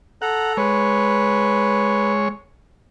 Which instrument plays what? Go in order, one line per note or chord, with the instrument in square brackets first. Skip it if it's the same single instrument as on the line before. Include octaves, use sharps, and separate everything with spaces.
[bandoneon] A4 A#5 [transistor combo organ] F#5
[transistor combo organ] G#3 C#5 [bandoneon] B4